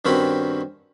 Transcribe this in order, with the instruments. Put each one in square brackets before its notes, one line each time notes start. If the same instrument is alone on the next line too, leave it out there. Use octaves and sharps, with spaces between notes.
[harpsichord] G2 D#3 C4 C#4 F#4 B5